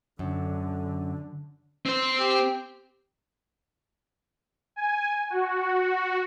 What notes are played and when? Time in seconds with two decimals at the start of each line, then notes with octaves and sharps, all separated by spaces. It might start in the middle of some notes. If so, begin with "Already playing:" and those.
0.19 F#2 D3
1.86 C4 C5
2.20 G4
4.76 G#5
5.30 F#4